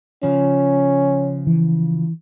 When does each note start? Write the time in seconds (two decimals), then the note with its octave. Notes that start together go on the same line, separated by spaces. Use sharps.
0.23 C#3 F3 C#4
1.47 E3